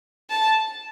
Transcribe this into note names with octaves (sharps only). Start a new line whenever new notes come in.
A5